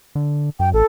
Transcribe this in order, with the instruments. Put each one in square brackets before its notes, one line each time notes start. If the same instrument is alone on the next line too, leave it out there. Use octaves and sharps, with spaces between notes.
[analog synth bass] D3
[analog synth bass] F#2 [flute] G5
[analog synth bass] A1 [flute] A4